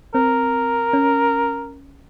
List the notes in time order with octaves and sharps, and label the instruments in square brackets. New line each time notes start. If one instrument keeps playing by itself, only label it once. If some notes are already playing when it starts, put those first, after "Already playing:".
[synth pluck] C4 [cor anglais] A#4
[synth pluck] C#4